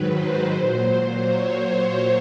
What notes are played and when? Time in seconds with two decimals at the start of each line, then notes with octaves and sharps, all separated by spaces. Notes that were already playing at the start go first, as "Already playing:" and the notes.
Already playing: G#2 D#3 F#3 B4
0.12 C5
0.50 A#2 F#3 C5
1.26 C#5
1.63 C5